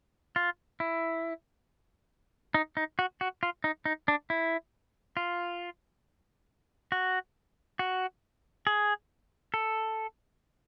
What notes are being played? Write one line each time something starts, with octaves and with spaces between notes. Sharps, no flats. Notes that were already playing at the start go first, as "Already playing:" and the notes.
F4
E4
D#4
D#4
F#4
F#4
F4
D#4
D#4
D4
E4
F4
F#4
F#4
G#4
A4